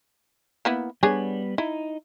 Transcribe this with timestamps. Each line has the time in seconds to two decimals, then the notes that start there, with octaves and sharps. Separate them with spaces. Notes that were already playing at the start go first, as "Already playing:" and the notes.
0.65 A#3 B3 E4
1.03 G3 B3 D4 G#4 C#5
1.58 D#4 E4